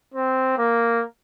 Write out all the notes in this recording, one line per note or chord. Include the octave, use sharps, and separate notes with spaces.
C4
A#3